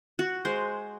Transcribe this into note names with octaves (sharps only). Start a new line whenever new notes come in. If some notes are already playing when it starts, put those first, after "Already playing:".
F#4
G#3 C5